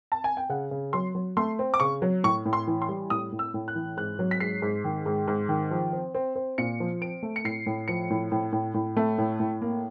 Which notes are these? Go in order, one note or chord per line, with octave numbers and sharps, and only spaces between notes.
A5
G#5
G5
C#3 F#5
C#3
F#3 C6
F#3
A3 C6
C4
D6
C#3 C#6
F#3
A2 C#6
A2
C6
E3
C6
G3
A2 D#6
A2
E6
A2
F#6
E3
G#2 F#6
F#3
B6
G#2 C7
G#2
D#3
G#2
G#2
D#3
F3
C4
C4
C4
A#2 C#7
F3
C4 D7
A3
C#7
A2 C7
A2
F3 C#7
A2
A2
A2
A2
A3
A2
A2
A#3